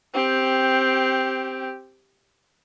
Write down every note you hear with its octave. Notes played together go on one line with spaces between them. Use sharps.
C4 G4